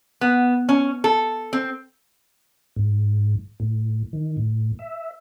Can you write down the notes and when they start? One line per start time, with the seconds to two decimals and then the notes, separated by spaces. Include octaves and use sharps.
0.21 B3
0.69 C#4
1.04 A4
1.53 C4
2.76 G#2
3.60 A2
4.13 D#3
4.37 A2
4.79 E5